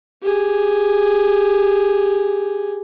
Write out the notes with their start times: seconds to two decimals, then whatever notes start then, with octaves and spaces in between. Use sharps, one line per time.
0.22 G4 G#4